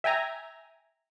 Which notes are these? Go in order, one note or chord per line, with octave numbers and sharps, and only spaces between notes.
E5 G5 G#5 A#5